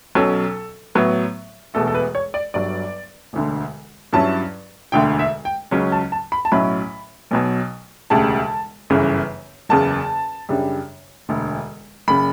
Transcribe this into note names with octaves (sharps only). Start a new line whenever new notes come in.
B1 B2 F#3 C#4 A4
A2 F#3 B3
E1 E2 B2 A3 A4
A4
B4
C#5
D5
G1 G2 F#3 D5
E1 D2 D3
G2 F#3 C#4 E4 A5
E1 D2 D3 A3 G5
E5
G5
C#2 C#3 F#3 C#4
A5
A5
B5
A5
B1 A2 F#3 C#4 E4 B5
B1 B2 F#3
E1 D2 C#3 G3 A5
G1 F#2 C#3 E3
F#1 E2 C#3 A5
F#2 C#3 G3 D4
E1 D2 D3
F#1 C#3 B5